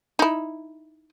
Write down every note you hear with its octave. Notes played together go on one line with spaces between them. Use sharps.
D#4 E4